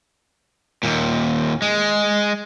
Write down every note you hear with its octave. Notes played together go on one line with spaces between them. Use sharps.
D#2 A#2
G#3